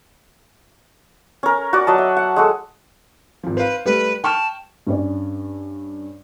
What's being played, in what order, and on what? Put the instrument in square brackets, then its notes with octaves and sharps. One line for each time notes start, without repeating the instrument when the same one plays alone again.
[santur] C#4 A#4
F#4 D5
F#3 D#5 A5
E5
F#5
G#3 F#4 A4
[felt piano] G#1 F3
[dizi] B4 [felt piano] C5 F5
[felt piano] G3 A3 [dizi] B4
[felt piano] G5 C#6 F6 [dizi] A5
[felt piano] G2 C#4 D5